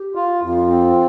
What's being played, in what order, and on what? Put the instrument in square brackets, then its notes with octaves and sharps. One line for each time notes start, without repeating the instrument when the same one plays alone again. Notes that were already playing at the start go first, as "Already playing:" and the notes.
Already playing: [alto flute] G4
[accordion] F4
[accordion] F2 [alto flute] F4
[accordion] C4